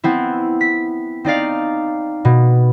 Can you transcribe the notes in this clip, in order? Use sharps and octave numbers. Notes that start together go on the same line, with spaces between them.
B3 C4 E4
B6
C4 D#4 D5 F5
B2